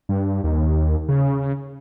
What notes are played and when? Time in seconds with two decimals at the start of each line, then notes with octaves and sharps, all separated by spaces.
0.09 G2
0.44 D#2
1.09 C#3